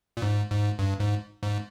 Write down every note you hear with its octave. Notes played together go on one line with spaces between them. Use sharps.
A#2
G#2
G#2
G2
G#2
G#2